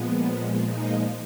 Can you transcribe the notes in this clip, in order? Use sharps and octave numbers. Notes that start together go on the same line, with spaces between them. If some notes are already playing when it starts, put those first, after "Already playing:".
Already playing: A#2 F3 G#3 B3
D#4